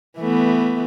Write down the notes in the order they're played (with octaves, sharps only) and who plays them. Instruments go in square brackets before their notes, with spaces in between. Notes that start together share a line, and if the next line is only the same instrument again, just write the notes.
[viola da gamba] E3 A3 B3